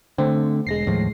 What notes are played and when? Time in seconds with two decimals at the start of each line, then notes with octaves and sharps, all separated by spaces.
0.18 D3 A3 C4
0.67 E1 G#3 A#6 C7
0.86 D#2 A2 F3